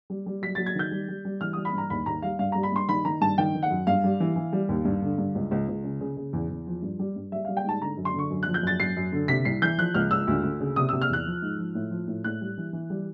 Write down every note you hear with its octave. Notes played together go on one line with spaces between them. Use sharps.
G3
G3
F#3 B6
F#3 A6
G#6
D#3 G6
G3
G3
G3
E3 F6
G3 D#6
B5
G2 A#5
D#2 B5
D#2 A#5
G3 F5
G2 F5
G3 A#5
B5
G2 C6
D#3 B5
D#3 A#5
G2 A5
D#3 G5
D#3
F#5
F#2
G2 F5
G3
E3
E3
G3
D#2
G2
D3
G2
C#2
C#2
C#2
C#3
C#3
C#3
E2
E2
F3
G2
G3
G2
G3 E5
G3 F5
G5
G#2 A5
D3 A#5
F#2
C6
D3 C#6
F#2
F3 F#6
G6
F#2 A6
F#2 C7
F#2
D3
C3 B6
C2 C7
E3 G6
F3 F#6
C#2 F6
C#2 E6
D2
D2
C#3
C3 D#6
C3 E6
F6
E2 F#6
F3
G#2
F3
A2
F3
A2
A2 F#6
G3
E3
E3
G3